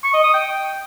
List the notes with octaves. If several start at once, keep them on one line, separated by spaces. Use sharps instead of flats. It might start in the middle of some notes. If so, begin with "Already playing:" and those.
C#6
D#5
D#6
G5